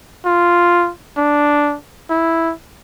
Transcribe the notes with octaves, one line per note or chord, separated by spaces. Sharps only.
F4
D4
E4